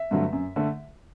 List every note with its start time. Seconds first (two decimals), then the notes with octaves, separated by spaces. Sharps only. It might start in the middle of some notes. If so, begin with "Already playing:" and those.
Already playing: E5
0.11 G2 D3 F#3 A3
0.33 F#2
0.56 D3 A3